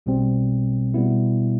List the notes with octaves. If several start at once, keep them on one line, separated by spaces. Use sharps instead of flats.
B1 B2 G3 C4
B2 G3 B3 E4